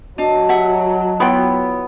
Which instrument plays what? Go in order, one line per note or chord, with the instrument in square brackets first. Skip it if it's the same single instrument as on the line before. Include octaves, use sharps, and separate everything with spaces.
[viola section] F#3 [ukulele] D4 [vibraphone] D#5 A5
[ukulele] G4 E5 F#5
[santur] B3 [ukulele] E4 F4 G5 [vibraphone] C#5